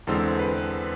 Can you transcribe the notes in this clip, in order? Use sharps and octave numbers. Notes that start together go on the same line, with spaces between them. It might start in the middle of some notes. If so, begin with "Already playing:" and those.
E2 D3 G#3 C4 A4
B4